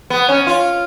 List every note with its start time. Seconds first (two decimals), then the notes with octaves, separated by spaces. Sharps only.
0.10 B3
0.29 C#4
0.47 F4